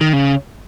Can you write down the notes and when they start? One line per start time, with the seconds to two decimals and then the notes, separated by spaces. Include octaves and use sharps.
0.01 D#3
0.13 C#3